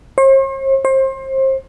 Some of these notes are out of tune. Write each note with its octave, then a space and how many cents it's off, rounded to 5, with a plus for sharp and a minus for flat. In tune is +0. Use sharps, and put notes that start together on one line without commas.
C5 +45
C5 +30